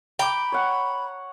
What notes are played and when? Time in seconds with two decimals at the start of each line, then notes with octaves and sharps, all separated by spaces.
0.19 G5 A#5 B5 D6
0.52 C#5 F#5